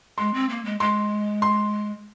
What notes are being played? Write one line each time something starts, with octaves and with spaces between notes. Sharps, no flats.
G#3 C6
C4
A#3
G#3
G#3 C6
C6